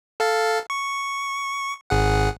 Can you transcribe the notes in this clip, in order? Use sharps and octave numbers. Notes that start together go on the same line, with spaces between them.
A4 F5 A5
C#6
G#1 G#4 F#5